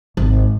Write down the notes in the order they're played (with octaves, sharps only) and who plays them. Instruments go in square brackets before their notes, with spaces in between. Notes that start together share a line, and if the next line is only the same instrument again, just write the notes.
[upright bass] G#1